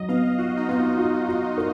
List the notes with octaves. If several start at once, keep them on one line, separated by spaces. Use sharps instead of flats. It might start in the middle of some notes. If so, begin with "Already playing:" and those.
Already playing: F#3 D#5
B3 F5
F4 F#4
D#4
B3 F4
F4
F4
A#4